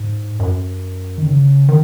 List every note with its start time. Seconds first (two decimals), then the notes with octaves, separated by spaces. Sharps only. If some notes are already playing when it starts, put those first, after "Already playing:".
Already playing: G#2
0.39 F#2
1.18 D#3
1.26 C#3
1.69 D#3